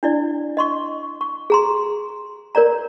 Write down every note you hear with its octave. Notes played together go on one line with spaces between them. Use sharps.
D4 E4 D5
D#5 C6 C#6
C#6
G#4 A#5 C6
A#4 C#5 D5 A#5